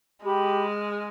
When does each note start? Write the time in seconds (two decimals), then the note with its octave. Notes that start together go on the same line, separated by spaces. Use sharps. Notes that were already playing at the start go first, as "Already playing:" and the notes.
0.24 G#3 G4 B5
0.65 F6